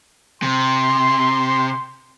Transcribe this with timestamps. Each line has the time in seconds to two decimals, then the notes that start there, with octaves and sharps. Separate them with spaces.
0.43 C3 C6